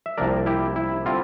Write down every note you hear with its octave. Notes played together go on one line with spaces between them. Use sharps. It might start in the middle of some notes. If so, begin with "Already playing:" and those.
E5
C2 C3 F3 A#3 D4 A#4 D5
E4 G4
E4
D3 G3 C4 E4 F4